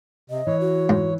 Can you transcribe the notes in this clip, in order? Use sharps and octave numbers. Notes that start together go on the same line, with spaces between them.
C3 D#5
E3 C#5
F#4
G#2